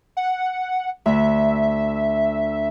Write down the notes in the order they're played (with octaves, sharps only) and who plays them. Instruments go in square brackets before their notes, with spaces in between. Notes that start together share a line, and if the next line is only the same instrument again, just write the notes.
[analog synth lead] F#5
[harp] D2 [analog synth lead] E5